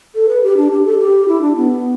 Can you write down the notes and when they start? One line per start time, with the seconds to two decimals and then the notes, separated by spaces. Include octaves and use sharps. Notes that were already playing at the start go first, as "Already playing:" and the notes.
0.15 A4
0.29 B4
0.43 G4
0.57 D4
0.71 G4
0.85 A4
0.98 G4
1.28 E4
1.42 D4
1.56 B3